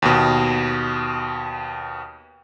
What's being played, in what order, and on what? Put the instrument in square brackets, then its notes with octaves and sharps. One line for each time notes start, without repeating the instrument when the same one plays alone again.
[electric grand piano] D#2 B2